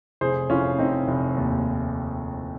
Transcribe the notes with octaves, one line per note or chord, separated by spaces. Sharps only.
F1 G#4 C5
F1 C#4 F4
F1 C4 D#4
F1
D#2